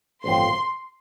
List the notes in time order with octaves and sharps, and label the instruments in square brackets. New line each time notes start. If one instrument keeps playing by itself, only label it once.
[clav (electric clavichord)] A1 G2 D3 F3 C4 [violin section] C6